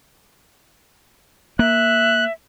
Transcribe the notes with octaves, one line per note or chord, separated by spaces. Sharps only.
A#3 E5 F#6